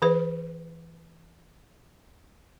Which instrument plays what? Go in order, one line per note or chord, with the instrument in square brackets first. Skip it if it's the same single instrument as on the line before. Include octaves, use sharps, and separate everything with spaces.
[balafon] E3 G#4 B4